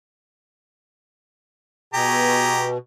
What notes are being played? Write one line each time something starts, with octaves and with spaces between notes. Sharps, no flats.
B2 G4 G#4 A#5